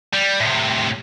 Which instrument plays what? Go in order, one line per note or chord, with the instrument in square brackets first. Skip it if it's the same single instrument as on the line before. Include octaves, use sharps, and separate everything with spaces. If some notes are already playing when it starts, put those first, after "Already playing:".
[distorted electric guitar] G3
A2 C3